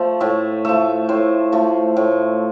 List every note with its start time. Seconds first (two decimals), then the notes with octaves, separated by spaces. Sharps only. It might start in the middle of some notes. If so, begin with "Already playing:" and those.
Already playing: F3 A3
0.20 A2 E5
0.65 F3 A3 E5
1.09 A2 C5
1.52 F3 A3
1.97 A2